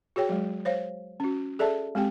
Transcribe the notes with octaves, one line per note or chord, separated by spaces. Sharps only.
F#4 G#4 C#5 G5
F#3 G#3
C5 C#5 F5
C#4 F#4
G#4 A4 D5 E5 A5
G#3 C4 G4 G5